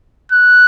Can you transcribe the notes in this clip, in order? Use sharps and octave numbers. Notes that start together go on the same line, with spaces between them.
F#6